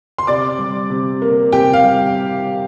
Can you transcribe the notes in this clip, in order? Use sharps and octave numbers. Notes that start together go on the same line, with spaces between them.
C6
C3 D5 D6
G3
C3
A#3
C3 G4 G5
F5
G3